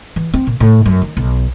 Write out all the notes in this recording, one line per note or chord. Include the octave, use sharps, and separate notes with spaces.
E3
C4
A#2
A2
F#2
D#3
B1